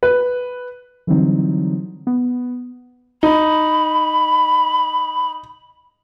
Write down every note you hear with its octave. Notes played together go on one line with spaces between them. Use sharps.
B4
D3 E3 F#3 G3 C4 D#4
B3
D#4 B5